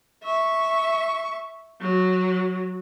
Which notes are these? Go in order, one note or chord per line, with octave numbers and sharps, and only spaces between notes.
E5 C#6
F#3